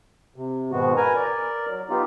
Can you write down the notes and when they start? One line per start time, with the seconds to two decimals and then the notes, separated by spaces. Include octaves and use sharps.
0.36 C3
0.72 G#2 B2 D#3 G#3 B3 F#4
0.97 A#4 B4 G#5 A#5
1.16 A#4 D5
1.67 F#3
1.90 B3 D#4 F4 G4